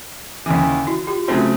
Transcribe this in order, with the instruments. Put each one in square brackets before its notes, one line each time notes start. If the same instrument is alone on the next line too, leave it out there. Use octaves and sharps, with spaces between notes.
[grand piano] D#2 C#3 E3
[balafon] E4 F#4
F4 G4
[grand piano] C#3 F#3 A3 C4 [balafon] D#4 F4